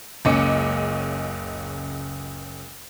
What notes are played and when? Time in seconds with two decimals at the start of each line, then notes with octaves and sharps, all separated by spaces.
0.25 F#1 C#2 C#4 D#5 D6 C#7